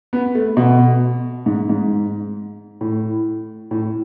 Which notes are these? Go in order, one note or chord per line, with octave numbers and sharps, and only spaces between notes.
B3
A3
B2
G#2
G#2
A2
A2